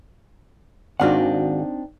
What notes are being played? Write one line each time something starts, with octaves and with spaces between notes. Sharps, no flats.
G#1 C4 D4 D#4 F#4 F5 F#5